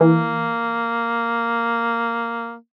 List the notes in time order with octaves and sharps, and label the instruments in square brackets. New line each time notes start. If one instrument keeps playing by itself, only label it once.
[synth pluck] E3 [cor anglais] A#3